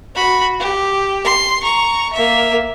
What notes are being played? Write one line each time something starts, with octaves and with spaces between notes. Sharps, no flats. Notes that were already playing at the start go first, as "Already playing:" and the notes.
F#4 B5
G4
C6
A#5 C#6
A#3 E5